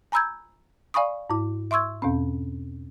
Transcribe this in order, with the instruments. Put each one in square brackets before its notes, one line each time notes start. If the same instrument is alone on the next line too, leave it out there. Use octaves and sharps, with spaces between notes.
[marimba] G#5 A#5 B5 E6 G6 G#6
D5 F5 G#5 B5 C#6 D#6
G#2 E4
E5 C6 C#6 E6 G#6
E2 B2 C4 C#4